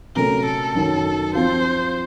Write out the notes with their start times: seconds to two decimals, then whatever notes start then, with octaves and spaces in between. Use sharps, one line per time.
0.15 C3 F#3 A3 C#4 A4 A#4
0.45 A4
0.75 F#2 D#3 F#3
1.35 F3 C4 F4 C5